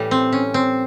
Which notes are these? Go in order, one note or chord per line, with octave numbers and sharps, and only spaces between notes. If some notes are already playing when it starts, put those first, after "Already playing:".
Already playing: A2 E3 G3
C4
C#4
C4